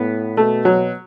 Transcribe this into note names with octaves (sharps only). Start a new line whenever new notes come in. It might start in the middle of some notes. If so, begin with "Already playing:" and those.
Already playing: A2 B3
B2 A3
F#3